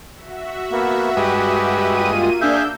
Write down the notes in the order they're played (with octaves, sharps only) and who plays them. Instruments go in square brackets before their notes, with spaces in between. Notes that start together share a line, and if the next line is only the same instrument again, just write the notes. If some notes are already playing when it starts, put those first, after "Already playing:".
[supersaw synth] F#4 E5
[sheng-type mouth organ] A#3 B3
[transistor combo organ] G2 G#3 D#5 [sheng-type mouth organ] G4 B4
[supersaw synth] A#3 [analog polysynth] F4 D#7
[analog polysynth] D4 E6 G6 [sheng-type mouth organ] G#4 E5 F5